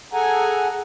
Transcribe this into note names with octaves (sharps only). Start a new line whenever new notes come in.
G#4 A4 F#5 G#5 A#5